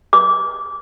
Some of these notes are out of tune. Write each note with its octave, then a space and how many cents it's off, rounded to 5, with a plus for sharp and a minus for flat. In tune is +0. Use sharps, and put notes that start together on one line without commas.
D6 -20